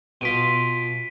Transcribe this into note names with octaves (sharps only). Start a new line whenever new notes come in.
B2 F4 B6 D7 D#7